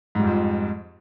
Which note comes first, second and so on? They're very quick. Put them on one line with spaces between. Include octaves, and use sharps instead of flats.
G#2 G3 F2 F3